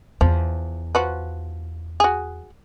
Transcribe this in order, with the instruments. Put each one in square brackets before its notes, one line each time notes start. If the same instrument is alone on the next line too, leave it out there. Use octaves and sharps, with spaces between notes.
[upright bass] E2 [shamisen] F3
[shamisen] F3 F#4 B4
F#4 G#4